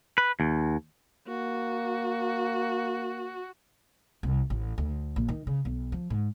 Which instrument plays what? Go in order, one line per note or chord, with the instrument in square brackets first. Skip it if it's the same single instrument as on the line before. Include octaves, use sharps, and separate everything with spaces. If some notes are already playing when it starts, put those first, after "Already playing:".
[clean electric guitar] B4
D#2
[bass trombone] A#3 [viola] F#4
[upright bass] C2
A1
D2
A#1
D#3
C#3
B1
F3
G#2